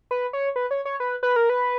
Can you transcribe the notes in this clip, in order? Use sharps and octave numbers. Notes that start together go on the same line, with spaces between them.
B4
C#5
B4
C#5
C#5
B4
B4
A#4
B4